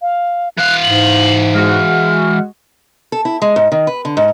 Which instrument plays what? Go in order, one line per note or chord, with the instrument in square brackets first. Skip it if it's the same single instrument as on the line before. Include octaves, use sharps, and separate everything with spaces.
[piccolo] F5
[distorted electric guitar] E3 F5 [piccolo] F#6
[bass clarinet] G#2 [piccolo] F#7
[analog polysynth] G#3 F#4 [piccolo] F6
[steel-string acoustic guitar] A4
E4
G#3
G#2
D#3
B4
D3
G#2